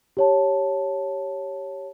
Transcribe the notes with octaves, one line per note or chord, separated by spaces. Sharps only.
G4 C#5 A5